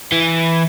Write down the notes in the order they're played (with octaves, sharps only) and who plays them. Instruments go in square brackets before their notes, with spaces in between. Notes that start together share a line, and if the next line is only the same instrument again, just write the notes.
[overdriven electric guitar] E3